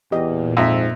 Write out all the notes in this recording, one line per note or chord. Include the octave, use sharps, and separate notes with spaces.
E2 A#2 G4 D#5
F2 G#2 E5 A#5 E6